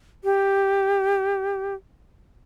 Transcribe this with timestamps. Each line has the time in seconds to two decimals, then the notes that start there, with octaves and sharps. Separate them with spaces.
0.24 G4